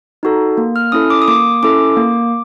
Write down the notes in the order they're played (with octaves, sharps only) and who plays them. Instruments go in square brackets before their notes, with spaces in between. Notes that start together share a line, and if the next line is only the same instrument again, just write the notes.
[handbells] D#4 F#4 A4
A#3
F6
C#4 E4 A4 D#6
D6
D#6
A#3 D6
C#4 E4 A4 D6
A#3